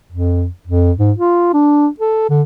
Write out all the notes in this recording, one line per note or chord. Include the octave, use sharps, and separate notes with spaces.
F2
F2
G#2
F4
D4
A4
D3